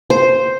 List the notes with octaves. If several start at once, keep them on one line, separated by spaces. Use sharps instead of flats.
C5